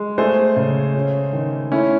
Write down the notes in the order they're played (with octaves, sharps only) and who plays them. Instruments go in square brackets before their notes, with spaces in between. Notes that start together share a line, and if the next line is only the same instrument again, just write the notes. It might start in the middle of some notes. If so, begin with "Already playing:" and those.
Already playing: [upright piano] G#3
[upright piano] A3 [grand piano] G#4 C5
[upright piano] C#3
C#4
D#3
[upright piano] A3 [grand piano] C#4 E4